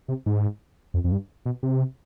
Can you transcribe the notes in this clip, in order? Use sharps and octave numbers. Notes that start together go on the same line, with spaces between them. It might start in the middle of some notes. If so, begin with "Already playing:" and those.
C3
G#2
F2
F2
G2
B2
C3